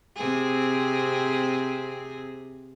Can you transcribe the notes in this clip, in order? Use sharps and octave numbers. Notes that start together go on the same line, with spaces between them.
C3 C4 G#4